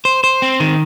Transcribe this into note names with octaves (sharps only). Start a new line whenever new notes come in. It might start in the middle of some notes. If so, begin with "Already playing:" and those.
C5
C5
C4
D#3